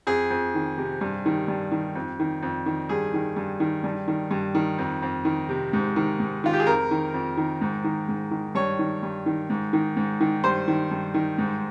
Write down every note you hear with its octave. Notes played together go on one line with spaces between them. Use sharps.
F2 G#4
F2
D#3
C3
G2
D#3
G2
D#3
F2
D#3
F2
D#3
G2 G#4
D#3
G2
D#3
G2
D#3
G2
D#3
F2
F2
D#3
C3
G#2
D#3
G#2
D#3 F4
G4
G#4
F2 A#4
D#3
F2
D#3
G#2
D#3
G#2
D#3
G2 C#5
D#3
G2
D#3
G#2
D#3
G#2
D#3
G2 C5
D#3
G2
D#3
G#2